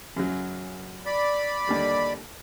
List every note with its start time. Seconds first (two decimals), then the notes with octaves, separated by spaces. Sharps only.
0.16 F#2 C#3 F#3
1.06 D5 B5
1.67 D#2 D3 G3